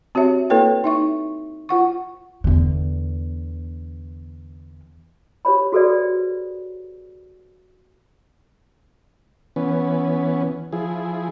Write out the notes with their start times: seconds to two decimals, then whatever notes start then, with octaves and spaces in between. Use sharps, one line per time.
0.15 C4 F#4 G4 C#5 E5
0.50 A#3 E4 A4 B4 C#5 G5
0.84 D#4 E5 C#6
1.69 F4 F#5 C#6
2.44 E2 D3
5.45 G4 C5 C#5 B5
5.72 F#4 G#4 A4 B4 C5 D5
9.56 E3 B3 C#4
10.72 F3 E4 G#4